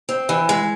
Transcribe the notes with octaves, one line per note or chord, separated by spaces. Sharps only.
C4
E3
G#3